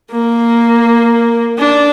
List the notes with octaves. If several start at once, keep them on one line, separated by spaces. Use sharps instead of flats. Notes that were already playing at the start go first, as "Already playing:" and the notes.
A#3
D4